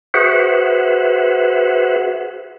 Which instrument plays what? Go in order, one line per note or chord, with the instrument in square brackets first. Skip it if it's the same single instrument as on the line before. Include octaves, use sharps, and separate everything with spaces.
[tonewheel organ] F#4 G#4 B4 C5 E5 F#5